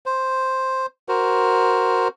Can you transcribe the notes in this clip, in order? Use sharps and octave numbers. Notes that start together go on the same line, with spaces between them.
C5
F#4 A#4 C5